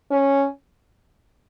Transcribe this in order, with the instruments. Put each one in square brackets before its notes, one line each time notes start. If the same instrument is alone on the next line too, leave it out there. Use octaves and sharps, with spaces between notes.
[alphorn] C#4